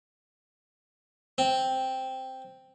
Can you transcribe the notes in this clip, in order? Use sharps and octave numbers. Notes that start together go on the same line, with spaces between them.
C4